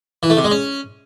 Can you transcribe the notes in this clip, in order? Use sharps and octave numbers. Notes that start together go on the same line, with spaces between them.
E3
A3
C3
G#3
C#4